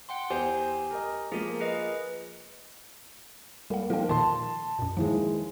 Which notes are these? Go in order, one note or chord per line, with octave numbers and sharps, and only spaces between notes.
F#5 G5 C6
E2 G4 C5 G#5 G6
A#4 D#5
F3 A#3 G#4 A#4
G#4 B4 D#5
G3 A#3 F#5
F3 A#3 D#4 A#4 G5
A#2 D#3 A5 C6
F#2 A#2
D#2 E3 F3 G#3